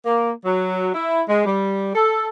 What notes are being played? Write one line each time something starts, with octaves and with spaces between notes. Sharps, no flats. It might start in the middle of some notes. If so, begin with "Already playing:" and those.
A#3
F#3
E4
G#3
G3
A4